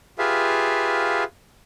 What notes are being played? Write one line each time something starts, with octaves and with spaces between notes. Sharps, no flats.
F4 G4 G#4 B4 E5 F5